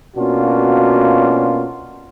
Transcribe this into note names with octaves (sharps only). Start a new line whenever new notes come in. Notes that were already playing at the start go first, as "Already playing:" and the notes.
B2 A#3 C#4 D4 F4 F#4